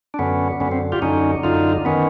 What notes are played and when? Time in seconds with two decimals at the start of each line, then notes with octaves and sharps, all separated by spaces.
0.14 D4
0.19 F#2 D3 B3 C#4
0.60 F#2 D3 B3 C#4
0.71 C4
0.92 F4 G4
1.02 F#2 D3 C#4 D#4
1.43 F#2 D3 D#4 F4
1.85 D#3 B3 C#4